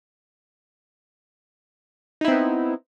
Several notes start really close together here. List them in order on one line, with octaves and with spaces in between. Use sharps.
D#4 E4 C4 B3